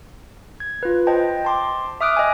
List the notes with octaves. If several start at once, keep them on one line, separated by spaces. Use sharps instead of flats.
G#6
F4 B4
C5 D#5 G5 A5
A5 C6 D6
E5 D6 D#6 F6 F#6 D7
D#5 G5 G#5